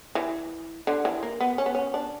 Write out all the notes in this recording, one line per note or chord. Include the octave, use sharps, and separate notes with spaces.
E3
D3
E3
A#3
B3
C#4
B3
C#4
D4